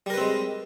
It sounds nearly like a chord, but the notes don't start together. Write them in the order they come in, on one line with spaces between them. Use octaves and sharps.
G3 A#4 B4 C4 G#3